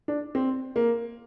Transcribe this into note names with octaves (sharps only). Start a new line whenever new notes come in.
D4
C4
A#3